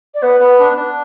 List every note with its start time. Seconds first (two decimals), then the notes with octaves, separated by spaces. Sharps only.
0.14 D5
0.22 B3 B4
0.40 B3
0.59 D4
0.76 D4